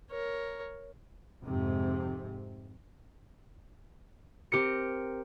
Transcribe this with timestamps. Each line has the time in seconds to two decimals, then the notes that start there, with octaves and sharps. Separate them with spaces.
0.10 A#4 C#5
1.43 F2 G#2 C3
4.52 C4 G4 A#4 C#7